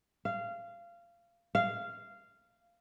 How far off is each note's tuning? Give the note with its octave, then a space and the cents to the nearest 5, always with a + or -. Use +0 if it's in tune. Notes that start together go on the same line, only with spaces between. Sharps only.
F5 -20
F5 -15